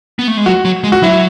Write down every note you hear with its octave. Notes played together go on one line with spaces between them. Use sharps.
B3
A3
G#3
F#3 F#4
F#3
G#3
F#4
F#3 E4